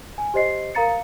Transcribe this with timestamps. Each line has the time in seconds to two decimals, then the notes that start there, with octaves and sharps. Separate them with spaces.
0.18 G#5
0.34 G4 C5 D#5 C7
0.75 A#4 F5 A#5 A6 C#7